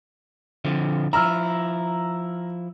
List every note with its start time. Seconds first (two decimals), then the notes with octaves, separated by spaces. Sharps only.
0.65 D3 F3 C4
1.13 F3 E4 A#5 E6 F6